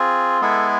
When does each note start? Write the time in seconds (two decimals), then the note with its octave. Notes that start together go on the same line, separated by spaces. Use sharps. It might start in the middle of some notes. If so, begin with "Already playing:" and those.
Already playing: C4 F4 G#4
0.41 G#3 B3 E4 G#4 A4